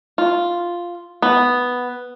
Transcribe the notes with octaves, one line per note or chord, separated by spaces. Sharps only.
F4
B3